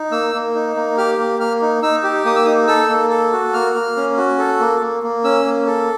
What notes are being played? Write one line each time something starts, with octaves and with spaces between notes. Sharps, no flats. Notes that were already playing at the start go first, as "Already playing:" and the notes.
Already playing: D#4
A#3 E6
A#3
D#4
A#3
G4 F6
A#3
A#3 F6
D#4
D#4 E6
G4
A#3 D#6
E6
D#4 D#6
A4 E6
A#3
A4
F#4
A#3 F6
A#3
C#4
F#4
A4
A#3
A#3
A#3
C#4 E6
A#3
A4